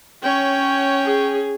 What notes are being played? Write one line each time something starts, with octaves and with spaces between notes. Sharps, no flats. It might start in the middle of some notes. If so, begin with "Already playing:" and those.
C#4 C#5 G5
G#4